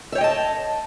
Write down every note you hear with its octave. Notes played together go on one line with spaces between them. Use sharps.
C#5 D#5 E5 G5 A5